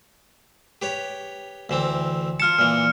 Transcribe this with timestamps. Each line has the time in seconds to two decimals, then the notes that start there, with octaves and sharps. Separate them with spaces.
0.82 G4 B4 C#5
1.69 D2 E3 C4
2.40 F4 A5 F6 C#7
2.59 A#2 E3 F6